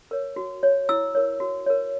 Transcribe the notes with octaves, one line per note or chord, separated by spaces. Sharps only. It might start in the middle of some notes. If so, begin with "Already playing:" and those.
A#4 C#5
F#4
C#5
E4 E6
A#4 C#5
F#4
A#4 C#5